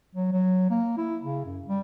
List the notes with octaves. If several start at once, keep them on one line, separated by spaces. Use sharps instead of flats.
F#3
F#3
A#3
E4
C#3
F#2
G3